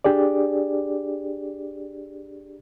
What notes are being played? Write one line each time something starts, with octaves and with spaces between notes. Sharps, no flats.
D4 G4 G#4 D5